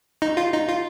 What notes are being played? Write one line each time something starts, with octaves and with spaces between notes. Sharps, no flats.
D#4
F4
D#4
F4